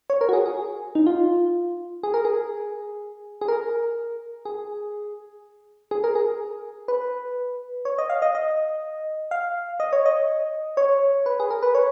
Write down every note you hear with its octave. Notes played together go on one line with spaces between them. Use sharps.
C#5
A#4
F#4
G#4
G#4
D#4
F4
G#4
A#4
G#4
G#4
A#4
G#4
G#4
A#4
G#4
B4
C#5
D#5
F5
D#5
D#5
F5
D#5
C#5
D#5
C#5
B4
G#4
A#4
B4
C#5